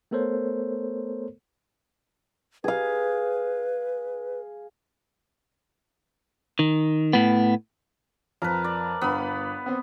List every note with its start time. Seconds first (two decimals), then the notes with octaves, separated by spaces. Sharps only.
0.11 A3 B3 A4 A#4 C5 C#5
2.64 G#4 B4 F5
6.59 D#3
7.13 A2 B3
8.42 F2 A#4 B4
8.64 D5
9.01 G1 B3 B5
9.66 B3 C4